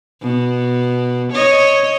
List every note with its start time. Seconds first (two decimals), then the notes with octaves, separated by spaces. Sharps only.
0.22 B2
1.33 C#5 D#5